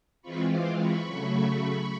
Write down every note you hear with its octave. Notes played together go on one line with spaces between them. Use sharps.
E3 G#3 C4 F4 B5 C#6
C6 D6
B5 C#6
C#3 F#3 A3